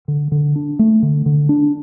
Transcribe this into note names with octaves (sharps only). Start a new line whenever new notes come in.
D3
D3
D4
A3
D3
D3
D4